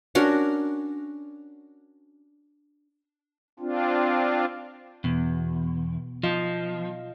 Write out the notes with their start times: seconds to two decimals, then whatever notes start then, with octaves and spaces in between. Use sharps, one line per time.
0.15 C#4 D4 F#4 A#4
3.60 C4 D4 F4
5.04 E2 B2 B3
6.23 F3 F4 D#5 F5